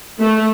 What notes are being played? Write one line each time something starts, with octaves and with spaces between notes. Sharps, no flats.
A3